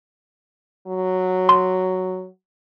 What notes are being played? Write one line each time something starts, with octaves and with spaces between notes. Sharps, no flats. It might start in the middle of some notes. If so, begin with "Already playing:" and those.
F#3
C6